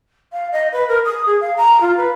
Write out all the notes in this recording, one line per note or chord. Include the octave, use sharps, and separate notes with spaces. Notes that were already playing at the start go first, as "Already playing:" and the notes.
F5
D#5
B4
A#4
D#6
G#4
F5
A#5
F4
B4